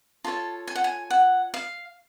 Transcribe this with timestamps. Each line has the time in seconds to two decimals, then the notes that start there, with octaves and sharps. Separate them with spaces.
0.24 F4 A4 C#5 A5
0.67 G#5
0.76 F#5
0.84 G#5
1.10 F#5
1.54 F5